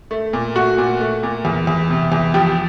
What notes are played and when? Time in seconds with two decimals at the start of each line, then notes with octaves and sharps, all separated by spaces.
0.11 A3
0.33 A#2
0.56 A3 F#4
0.78 A#2
1.01 A3
1.23 A#2
1.45 E2
1.67 E2
1.90 C3
2.12 E2
2.34 F3 G4